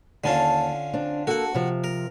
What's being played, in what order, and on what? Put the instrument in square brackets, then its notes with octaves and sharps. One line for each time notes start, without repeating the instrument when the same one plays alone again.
[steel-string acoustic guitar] D#2 A5 [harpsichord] D3 C#4 F4
[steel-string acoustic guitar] C4 D4
[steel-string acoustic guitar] A#3 A4 [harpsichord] F#4 F#5
[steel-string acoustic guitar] C3 F3
[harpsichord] A#4